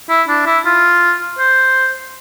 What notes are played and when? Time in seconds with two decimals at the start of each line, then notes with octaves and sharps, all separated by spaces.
0.10 E4
0.29 D4
0.46 E4
0.66 F4
1.39 C5